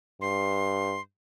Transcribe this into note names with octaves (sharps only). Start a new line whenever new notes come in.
G2 C6